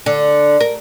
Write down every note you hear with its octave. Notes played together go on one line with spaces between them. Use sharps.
D3
A#4